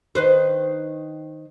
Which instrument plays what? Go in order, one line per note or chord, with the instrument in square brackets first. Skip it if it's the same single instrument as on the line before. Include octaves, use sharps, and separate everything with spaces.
[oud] D#3 B4 C5